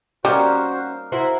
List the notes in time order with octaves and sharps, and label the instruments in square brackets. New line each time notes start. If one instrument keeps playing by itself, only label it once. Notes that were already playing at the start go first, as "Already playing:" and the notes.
[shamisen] G3 [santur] A#3 D#4 F5 [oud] C#4 [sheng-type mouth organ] F#4 C5
[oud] E4 F#4 C5 [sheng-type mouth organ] E5 [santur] A#5